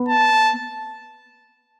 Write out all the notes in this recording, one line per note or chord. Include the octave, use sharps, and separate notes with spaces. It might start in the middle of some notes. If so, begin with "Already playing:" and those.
Already playing: B3
A5